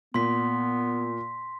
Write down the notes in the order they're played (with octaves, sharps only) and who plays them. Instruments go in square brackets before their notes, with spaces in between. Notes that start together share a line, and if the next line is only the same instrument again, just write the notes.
[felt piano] A#2 [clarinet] B3 [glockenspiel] C6 B6